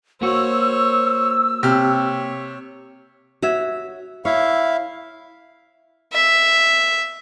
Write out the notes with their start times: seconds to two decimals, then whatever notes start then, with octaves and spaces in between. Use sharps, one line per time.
0.22 A#3 F#4 C5 C#5 E6
1.63 C3 C#5 F6
3.42 F#4 C#5 E5
4.25 E4 C#5 E5 F5
6.13 E5